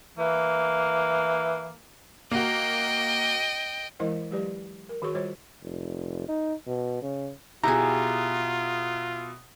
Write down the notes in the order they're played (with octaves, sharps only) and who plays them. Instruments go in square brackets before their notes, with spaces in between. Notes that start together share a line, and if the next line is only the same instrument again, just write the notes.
[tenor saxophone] E3 [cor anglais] A#3
[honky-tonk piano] A#3 F#4 [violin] D#5 G5
[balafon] E3 G#3 E4 A#4 C5 D#5
F#3 G#3 G4 B4 D5
A#4
D#3 F#4 G#4 C#5 C#6
G3 F4 C5 C#5
[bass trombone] F1
D#4
B2
C#3
[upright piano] B2 E4 [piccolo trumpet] F4 [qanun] G4 G#4 [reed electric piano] A#5